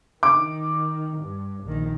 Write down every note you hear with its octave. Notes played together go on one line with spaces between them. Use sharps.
D#3 D6
G2
A#1 D#3